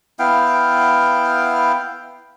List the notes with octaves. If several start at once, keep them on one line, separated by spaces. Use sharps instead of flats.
B3 E4 F5 G5